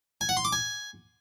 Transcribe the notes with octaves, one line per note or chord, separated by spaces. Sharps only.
G#5
F#5
C6
D6
G#5